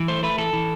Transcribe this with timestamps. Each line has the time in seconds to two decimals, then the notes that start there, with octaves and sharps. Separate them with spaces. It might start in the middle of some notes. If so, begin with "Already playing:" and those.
Already playing: E3
0.08 A3 C5
0.23 A3 B4
0.38 E3 A4
0.53 E3